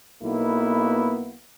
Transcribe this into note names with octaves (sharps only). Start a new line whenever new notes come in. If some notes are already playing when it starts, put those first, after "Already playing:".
B1 A#3 B3 E4